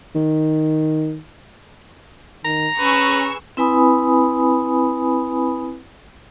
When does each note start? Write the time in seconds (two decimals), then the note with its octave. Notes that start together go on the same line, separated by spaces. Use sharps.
0.15 D#3
2.45 D#3 A#5
2.80 C#4 G#4 B4 C#6 E6
3.57 C4 E4 B4 G#5 B5 D#6